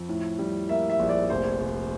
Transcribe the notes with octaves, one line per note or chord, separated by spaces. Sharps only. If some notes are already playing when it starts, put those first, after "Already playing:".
Already playing: F2
A2
G3
A#3 E5
E5
A#1
D5
F1 C5
F1